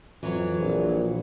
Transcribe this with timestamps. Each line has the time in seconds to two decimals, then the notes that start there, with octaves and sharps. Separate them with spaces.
0.23 F2 E3 F#3
0.61 A#1 A#2